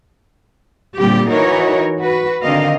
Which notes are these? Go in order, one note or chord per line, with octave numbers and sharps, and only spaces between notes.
A#2 D3 G3 C4 G4
E3 D#4 F#4 A#4 C#5
F#4 B4
D3 D#3 C4 A#4 D#5 F5